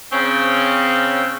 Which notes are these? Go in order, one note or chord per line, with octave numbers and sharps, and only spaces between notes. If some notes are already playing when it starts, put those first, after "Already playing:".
C#3 C4 C#4